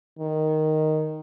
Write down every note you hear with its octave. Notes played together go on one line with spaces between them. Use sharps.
D#3